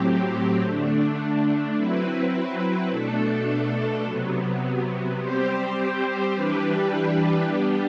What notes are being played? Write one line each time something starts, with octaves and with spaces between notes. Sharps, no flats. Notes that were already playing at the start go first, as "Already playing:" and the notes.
Already playing: A2 F#3 C4 G4
D3 A3 D4
F#3 C4 E4 B4
B2 A3 D4 A4
C3 F#3 B3
G3 C4 G4 C5
E3 G3 D4 G4 B4
G3 B3 D4 G4